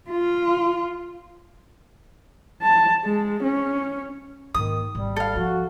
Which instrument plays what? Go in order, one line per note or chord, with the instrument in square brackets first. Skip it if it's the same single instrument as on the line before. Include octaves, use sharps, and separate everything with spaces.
[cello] F4
[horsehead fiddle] A5
G#3
C#4
[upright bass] G#2 A#3 [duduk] D#3 [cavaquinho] D#6
[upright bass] G#1 [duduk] G3
[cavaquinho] A4 F5
[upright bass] F3 [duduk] F#4